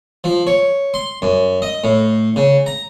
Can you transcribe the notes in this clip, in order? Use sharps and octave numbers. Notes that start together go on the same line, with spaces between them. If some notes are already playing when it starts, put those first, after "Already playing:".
F3
C#5
C6
F#2
D#5
A2
C#3
A#5